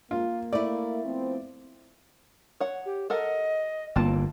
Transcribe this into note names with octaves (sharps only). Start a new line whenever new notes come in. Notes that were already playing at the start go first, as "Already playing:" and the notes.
A#3 F4
A3 E4 D5
F3 B3 C4
C#5 F#5
G4
A4 A#4 D#5 F#5
G1 A#3 C4 F4 A5